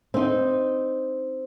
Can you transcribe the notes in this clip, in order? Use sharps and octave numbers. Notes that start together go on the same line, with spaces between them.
C4 D#4